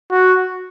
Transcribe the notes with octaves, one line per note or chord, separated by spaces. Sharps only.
F#4